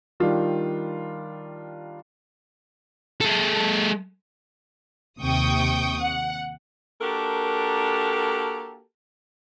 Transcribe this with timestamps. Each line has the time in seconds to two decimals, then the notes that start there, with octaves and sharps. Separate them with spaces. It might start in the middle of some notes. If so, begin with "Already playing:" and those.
0.20 D#3 G3 D4 F4
3.21 G#3 A4
5.20 D#2 C3 G5 C#6 D#6
6.01 F#5
7.01 A#3 D4 F#4 G4 A4 A#4